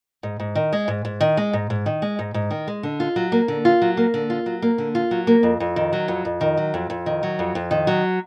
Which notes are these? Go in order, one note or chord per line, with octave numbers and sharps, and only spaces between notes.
G#2
G#2
D#3
G#3
G#2
G#2
D#3
G#3
G#2
G#2
D#3
G#3
G#2
G#2
D#3
G#3
D3
F4
F#3
A#3
D3
F4
F#3
A#3
D3
F4
F#3
A#3
D3
F4
F#3
A#3
F2
F2
D#3
F#3
F2
F2
D#3
F#3
F2
F2
D#3
F#3
F2
F2
D#3
F#3